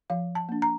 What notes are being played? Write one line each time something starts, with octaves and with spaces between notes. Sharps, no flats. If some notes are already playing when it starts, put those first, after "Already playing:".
F3 F5
A5
A#3 D4
A#5